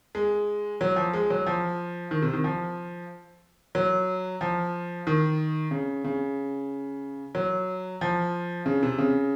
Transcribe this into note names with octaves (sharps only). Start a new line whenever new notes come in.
G#3
F#3
F3
G#3
F#3
F3
D#3
C3
D#3
F3
F#3
F3
D#3
C#3
C#3
F#3
F3
C#3
C3
C#3